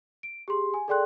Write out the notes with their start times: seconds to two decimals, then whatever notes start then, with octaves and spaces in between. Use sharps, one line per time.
0.23 D7
0.48 G4 G#4 C6
0.74 G#5
0.88 G#4 A4 D5 G5 C6 F#6